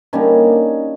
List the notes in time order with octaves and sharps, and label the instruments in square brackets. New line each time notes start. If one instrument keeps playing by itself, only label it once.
[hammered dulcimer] D3 G3 A#3 C#4 D#4